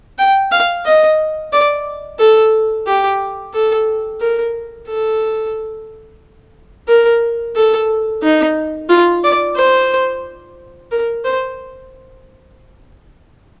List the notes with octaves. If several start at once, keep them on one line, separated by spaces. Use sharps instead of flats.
G5
F5
D#5
D5
A4
G4
A4
A#4
A4
A#4
A4
D#4
F4
D5
C5
A#4
C5